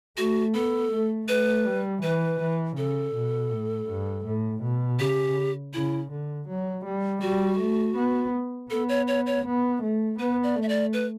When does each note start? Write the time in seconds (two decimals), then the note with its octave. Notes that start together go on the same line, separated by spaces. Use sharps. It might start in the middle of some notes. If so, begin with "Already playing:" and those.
0.17 A3 F#4
0.54 B3 A4
0.92 A3
1.28 A3 B4
1.65 G3
2.02 E3 B4
2.40 E3
2.77 C#3 A4
3.15 B2
3.51 A2
3.88 G2
4.25 A2
4.63 B2
4.99 C#3 G4
5.74 C#3 E4
6.11 D3
6.48 F#3
6.85 G3
7.22 G3 F#4
7.59 A3
7.96 B3
8.70 B3 A4
8.89 C#5
9.08 C#5
9.26 C#5
9.45 B3
9.82 A3
10.19 B3 B4
10.43 D5
10.55 A3
10.62 E5
10.69 D5
10.93 B4